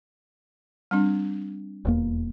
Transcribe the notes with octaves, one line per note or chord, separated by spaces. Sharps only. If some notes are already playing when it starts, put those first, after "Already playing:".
G3 C4 D4
D#1 E2 A#3